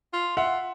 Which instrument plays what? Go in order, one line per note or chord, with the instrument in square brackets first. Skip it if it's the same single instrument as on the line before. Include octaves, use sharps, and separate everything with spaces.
[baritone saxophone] F4
[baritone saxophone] F4 [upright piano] E5 F#5